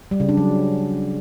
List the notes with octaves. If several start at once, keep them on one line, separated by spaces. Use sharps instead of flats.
G3
C#3
D4
F#3